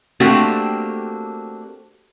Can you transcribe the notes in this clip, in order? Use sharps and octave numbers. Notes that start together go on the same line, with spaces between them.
A3 A#3 C4 D4 F#4 G4